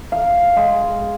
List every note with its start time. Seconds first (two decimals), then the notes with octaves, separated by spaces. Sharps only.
0.12 F5
0.56 G#3